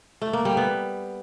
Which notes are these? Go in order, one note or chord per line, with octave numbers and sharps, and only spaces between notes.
A3
A#3
G3
B3